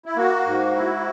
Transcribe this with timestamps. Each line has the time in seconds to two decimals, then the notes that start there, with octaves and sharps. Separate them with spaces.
0.06 E4
0.17 A#3 F#4
0.46 G#2
0.76 E4